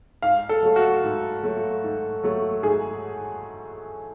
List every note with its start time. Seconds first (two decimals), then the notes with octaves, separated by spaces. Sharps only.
0.22 G#2 F5
0.49 A4
0.63 F#3 A3
0.76 F#4
1.03 G#2
1.43 F#3 A3
1.83 G#2
2.23 F#3 A3
2.62 G#2 G#4